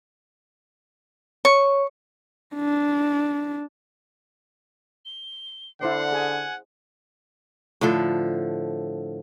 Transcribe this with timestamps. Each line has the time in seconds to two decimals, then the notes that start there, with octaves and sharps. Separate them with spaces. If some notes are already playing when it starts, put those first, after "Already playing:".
1.45 C#5 C#6
2.56 D4
5.05 G7
5.81 D3 E4 C5 D5 F#5 C7
6.12 G#4 G#5
7.81 A2 D3 F3 A4